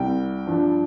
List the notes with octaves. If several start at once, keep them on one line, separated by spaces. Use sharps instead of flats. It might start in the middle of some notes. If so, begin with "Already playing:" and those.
Already playing: C2 C3 G3 G5
G2 F3 D4